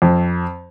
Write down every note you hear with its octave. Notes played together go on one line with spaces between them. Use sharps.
F2